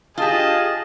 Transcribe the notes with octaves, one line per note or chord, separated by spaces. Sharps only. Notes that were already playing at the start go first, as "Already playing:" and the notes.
F4 G4 G#4 D#5 F5 A5